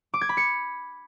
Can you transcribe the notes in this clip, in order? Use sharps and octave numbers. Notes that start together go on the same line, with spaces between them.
D6
G#6
B5
C#7